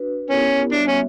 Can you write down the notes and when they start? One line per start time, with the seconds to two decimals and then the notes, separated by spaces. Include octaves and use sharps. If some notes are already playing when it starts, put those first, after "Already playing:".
Already playing: D4 F#4 B4
0.30 B3 C#4 E4 G4 A#4
0.72 G3 B3 D4 F#4 C#5 E5
0.88 C#4